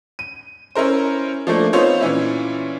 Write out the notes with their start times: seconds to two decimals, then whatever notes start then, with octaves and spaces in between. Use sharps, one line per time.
0.19 D#7
0.75 C#4 E4 A#4 C5
1.47 F3 A3 A#3 D4
1.73 B3 C4 D#4 F4 C5 C#5
2.01 A#2 E3 C#4 E4